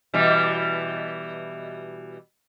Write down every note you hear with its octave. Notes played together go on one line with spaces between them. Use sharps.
B2 E3 G3